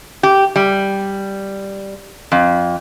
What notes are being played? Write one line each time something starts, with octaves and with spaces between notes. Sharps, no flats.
G4
G3
F2